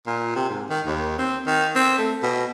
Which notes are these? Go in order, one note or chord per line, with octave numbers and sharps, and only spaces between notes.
A#2
C3
G#2
D#3
D#2
C4
D#3
C4
A3
B2